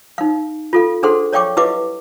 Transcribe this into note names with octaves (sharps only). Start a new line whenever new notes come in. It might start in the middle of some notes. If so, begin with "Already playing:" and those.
D#4 F5
F4 A4 F5
D4 G#4 A4 C5 F#5 C6
C#5 D5 F5 G5 C#6 D6
E4 G4 B4 D#5 F5 D6